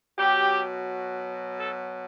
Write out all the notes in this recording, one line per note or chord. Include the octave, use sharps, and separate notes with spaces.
B2 F#3 G4
A4